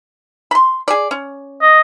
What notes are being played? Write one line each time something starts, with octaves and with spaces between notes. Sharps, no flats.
B5 C6
G#4 D5
C#4
D#5